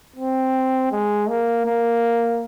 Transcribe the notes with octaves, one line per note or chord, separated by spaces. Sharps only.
C4
G#3
A#3
A#3